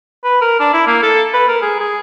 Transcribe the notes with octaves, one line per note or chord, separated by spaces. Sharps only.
B4
A#4
D4
E4
A#3
A4
B4
A#4
G#4
G#4